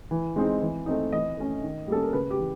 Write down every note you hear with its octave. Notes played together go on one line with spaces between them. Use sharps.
E3
G#3 C4 D#4
E3
A3 C4 D#4
E3 D#5
A3 C#4
D#3
G3 A#3 C#4 A4
A#4
C#3 B4
G4
E3